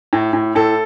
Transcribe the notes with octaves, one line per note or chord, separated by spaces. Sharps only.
A2
A2
A2 A4